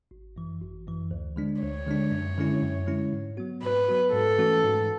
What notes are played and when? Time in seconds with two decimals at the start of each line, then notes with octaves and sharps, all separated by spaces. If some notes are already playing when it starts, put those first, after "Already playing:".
0.11 G#1
0.36 F#2 E3
0.61 G#1
0.87 F#2 E3
1.11 D2
1.36 D3 G#3 D4
1.61 D2 C#5
1.87 D3 G#3 D4
2.12 F#2
2.38 D3 G#3 C#4 E4
2.62 F#2
2.87 D3 G#3 C#4 E4
3.13 G#2
3.37 F#3 B3 F#4
3.63 G#2 B4
3.88 F#3 B3 F#4
4.13 G#2 A4
4.38 E3 A3 C#4 F#4
4.63 G#2